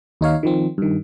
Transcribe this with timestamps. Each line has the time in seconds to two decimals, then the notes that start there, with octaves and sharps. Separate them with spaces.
0.21 D#2 D#4 C#5 F5
0.43 D#3 F3 C4
0.78 G2 D#3